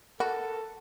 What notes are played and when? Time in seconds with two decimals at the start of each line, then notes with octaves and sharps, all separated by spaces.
0.20 F#4 A4 A#4 B5